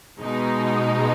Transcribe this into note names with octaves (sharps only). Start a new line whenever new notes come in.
B2 G#3 D#4